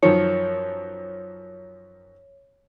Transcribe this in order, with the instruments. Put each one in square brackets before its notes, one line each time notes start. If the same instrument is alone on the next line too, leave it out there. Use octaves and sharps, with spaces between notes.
[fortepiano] F#2 D#3 F3 [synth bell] C#5